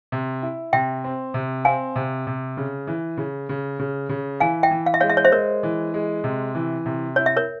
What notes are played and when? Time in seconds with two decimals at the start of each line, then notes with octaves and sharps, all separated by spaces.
0.12 C3
0.42 E4
0.73 C3 E5 G5
1.04 C4
1.34 C3
1.65 C4 F5 G#5
1.96 C3
2.27 C3
2.57 C#3
2.87 E3
3.17 C#3
3.49 C#3
3.79 C#3
4.09 C#3
4.40 E3 F5 G#5
4.63 E5 G5
4.71 E3
4.86 F5
4.94 E5
5.00 G#3 C#5 F5
5.10 E5
5.17 C#5
5.25 C5 E5
5.32 G#3 A#4 C#5
5.63 E3
5.94 G#3
6.24 C3
6.55 E3
6.86 C3
7.16 E4 C#5
7.26 E5
7.37 A#4 C#5